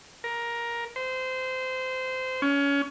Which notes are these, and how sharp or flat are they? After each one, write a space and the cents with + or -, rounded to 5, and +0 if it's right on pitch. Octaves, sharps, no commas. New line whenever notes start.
A#4 +10
C5 -20
C#4 +25